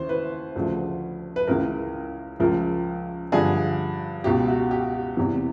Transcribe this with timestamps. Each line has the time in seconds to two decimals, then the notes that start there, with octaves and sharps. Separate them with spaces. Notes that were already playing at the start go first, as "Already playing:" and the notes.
Already playing: D#2 C#3 E3 C5
0.09 B4
0.56 D2 C#3 F3
1.36 B4
1.47 C#2 C#3 E3 A#4
2.40 C#2 C#3 F3 A#4
3.32 G2 D3 F3 G#4
4.24 C#2 B2 G4
4.48 F#4
4.71 G4
5.17 E2 C3 E3